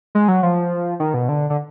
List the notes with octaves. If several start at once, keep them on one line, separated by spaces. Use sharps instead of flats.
G#3
F#3
F3
D#3
B2
D3
D3